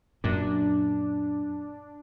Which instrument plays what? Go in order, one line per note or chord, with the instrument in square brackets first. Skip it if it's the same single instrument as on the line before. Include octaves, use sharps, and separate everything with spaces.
[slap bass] F#2 A#2 [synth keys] D4